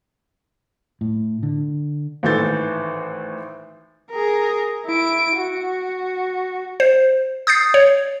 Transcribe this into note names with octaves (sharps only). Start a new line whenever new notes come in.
A2
D3
G#1 A2 E3 A4 G6 A6
G#4 A#4
E4 D7
F#4
C5
D#6 G6 A6 C7
C#5